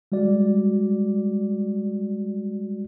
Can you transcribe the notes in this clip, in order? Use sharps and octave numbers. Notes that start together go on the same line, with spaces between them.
G3 G#3 F#4 D5